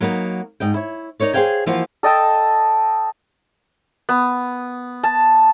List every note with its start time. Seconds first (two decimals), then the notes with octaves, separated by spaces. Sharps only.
0.01 F#3 A#3 B3 D#4
0.60 G#2 D#5 G5
0.74 E4 C#5
1.20 D#4 A#4 C#5 D5
1.33 G#4 C5 C#5 F5 G5 G#5
1.66 E3 F3 A#3 F4 F#4 F5
2.03 A4 D#5 G5 A5
4.09 B3
5.03 A5